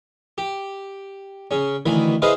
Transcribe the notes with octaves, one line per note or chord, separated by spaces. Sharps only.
G4
C#3 C#4
D2 D#3 E3 B5
E4 G#4 B4 C5 D#5 F5